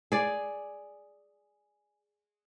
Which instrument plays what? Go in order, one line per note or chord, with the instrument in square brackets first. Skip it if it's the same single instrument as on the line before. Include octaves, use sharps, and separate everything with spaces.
[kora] G#4 D5